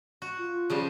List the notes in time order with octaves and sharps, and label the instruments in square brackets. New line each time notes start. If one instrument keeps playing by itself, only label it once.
[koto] F#4
[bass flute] F4
[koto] C#3 F3 G3